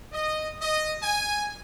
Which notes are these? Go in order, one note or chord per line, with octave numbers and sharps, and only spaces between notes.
D#5
D#5
G#5